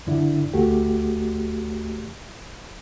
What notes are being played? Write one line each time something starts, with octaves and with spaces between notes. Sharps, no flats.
F#2 D3 D4 E4
D2 A3 F#4 G4